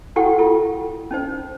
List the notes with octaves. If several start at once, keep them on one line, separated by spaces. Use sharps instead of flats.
E4 F#4 A4 F#5 G5 C#6
E4 F4 A4
C#4 D#4 C5